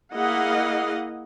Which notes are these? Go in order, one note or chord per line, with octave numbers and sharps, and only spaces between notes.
A#3 E4 G#4 D#5 F5 F#5